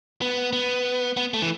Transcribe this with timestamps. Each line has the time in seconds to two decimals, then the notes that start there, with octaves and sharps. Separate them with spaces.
0.22 B3
0.53 B3
1.17 B3
1.34 A3
1.42 E3